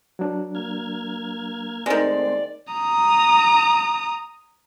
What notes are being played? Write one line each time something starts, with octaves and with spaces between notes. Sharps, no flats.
F#3 D4
A#3 F6 G#6
D#3 G#3 A3 C4 C5 D5
A#5 D#6